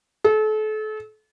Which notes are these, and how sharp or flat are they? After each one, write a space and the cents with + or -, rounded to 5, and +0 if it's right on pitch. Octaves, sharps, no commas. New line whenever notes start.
A4 -35